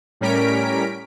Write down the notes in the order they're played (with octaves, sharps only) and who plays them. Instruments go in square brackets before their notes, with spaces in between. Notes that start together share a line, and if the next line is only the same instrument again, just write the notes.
[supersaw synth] A2 G3 C#4 A#4 B6 D7